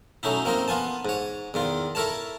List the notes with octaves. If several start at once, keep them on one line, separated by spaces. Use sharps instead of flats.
F#3 A3 C#4 D#4 E4
A#3 C4 D#4 A#4
B3 F4 G#5 A5
G#2 C#5
E2 D#3 F4
E4 A4 A#4 C#5 A5